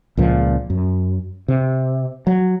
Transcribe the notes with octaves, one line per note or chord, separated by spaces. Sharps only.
C#2 A#2 F3
F#2
C3
F#3